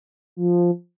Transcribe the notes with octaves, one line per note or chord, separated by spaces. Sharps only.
F3